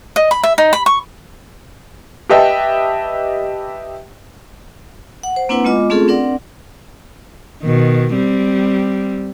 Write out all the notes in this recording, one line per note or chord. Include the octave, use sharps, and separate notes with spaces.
D#5
B5
E5
D#4
B5
C#6
G4 B4 D#5 E5 G5 A5
F#5
C5
A#3 C4 D4 E4 B4 F#5
G#3 B3 F4 D#5 D6
A3 C4 C#4 F4 G#4 A4
C4 D4 A#4 D5 F#5
B2 D#3
G3 C4